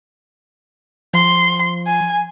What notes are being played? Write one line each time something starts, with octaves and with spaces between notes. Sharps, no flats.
F3 C6
G#5